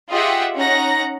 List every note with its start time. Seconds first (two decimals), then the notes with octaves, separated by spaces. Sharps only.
0.11 F4 G4 G#4 D#5 E5 F#5
0.56 C#4 D#4 F#5 A#5 A#6